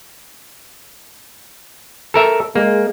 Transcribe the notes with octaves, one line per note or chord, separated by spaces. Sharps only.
A4 A#4 E5
G#3 A#3